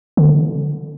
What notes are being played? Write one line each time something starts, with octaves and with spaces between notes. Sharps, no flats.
D3